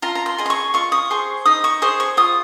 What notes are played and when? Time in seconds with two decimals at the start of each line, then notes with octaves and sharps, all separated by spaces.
0.02 F4 A#5
0.15 A#5
0.26 C6
0.38 G#4 D#5
0.46 C6
0.50 C#6
0.74 F4 C#6
0.92 D#6
1.10 G#4 C5 C#6
1.45 D#4 D#6
1.64 C#6
1.82 G#4 C5 D#6
2.00 C#6
2.17 F4 D#6